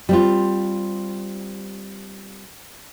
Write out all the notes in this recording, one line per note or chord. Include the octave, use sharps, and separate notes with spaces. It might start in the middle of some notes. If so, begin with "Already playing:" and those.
G3 C4 F4